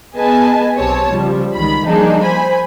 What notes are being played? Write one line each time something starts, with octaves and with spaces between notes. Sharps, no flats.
B3 G#4 B4 D#5 G#5 A5
B1 C4 G4 C#5 A5
C#3 F3 G3
C#2 D#3 B5
F3 G3 A#3 D4 D#4 G#4
C5 G#5 B5